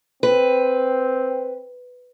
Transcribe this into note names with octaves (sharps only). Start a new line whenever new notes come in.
C4 B4